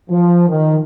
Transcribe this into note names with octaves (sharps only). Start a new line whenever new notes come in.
F3
D#3